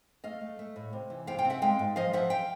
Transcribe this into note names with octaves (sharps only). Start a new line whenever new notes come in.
A3 D#5 F5
A3
A3
A2
C3
E3
C3 F5 G5
F5 G5
C4
E5 F#5
G#3 F5 G5
G#2
F3 D#5 F5
F3 E5 F#5
F5 G5